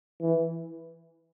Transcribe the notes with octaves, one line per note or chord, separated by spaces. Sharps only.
E3